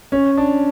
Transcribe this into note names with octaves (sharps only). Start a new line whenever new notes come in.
C#4
D4